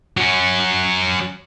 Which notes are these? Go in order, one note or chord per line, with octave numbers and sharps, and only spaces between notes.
F#3 C#4